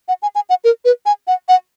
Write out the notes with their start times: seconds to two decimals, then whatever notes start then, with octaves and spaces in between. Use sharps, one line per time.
0.08 F#5
0.22 G#5
0.35 G#5
0.49 F#5
0.64 A#4
0.85 B4
1.06 G#5
1.27 F#5
1.49 F#5